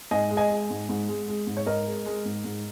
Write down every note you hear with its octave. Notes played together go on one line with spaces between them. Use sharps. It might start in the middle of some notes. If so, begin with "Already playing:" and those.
G#2 D#5 G#5
G#3
D#5 G#5
G#3
G#2
G#2
G#3
G#3
G#2
C#5
G#2 A#4 D#5
G#3
G#3
G#2
G#2